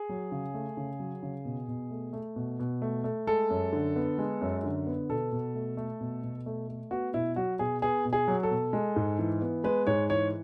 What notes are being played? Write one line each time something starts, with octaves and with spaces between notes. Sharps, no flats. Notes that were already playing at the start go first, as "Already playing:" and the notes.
Already playing: G#4
F#3
C#3
A3
C#3
F#3
C#3
B2
B2
A3
A3
B2
B2
A3
A3
G#3 A4
F#2
D3
B3
G#3
F#2
D3
B3
B2 A4
B2
A3
A3
B2
B2
A3
A3
B3 F#4
B2 E4
F#3 F#4
B2 G#4
B3 G#4
B2
G#4
F#3
A4
B2
G#3
G#2
E3
B3
G#3 B4
G#2 C#5
E3 C#5